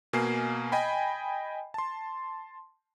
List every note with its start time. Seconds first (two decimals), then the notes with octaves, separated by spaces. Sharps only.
0.13 B2 A#3 G#5 C7
0.72 D#5 G5 G#5 B5
1.74 A5 C6